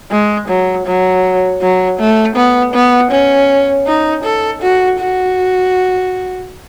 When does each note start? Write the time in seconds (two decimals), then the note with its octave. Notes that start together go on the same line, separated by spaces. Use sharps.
0.11 G#3
0.48 F#3
0.86 F#3
1.61 F#3
1.99 A3
2.36 B3
2.74 B3
3.11 C#4
3.87 D#4
4.24 A4
4.62 F#4
4.99 F#4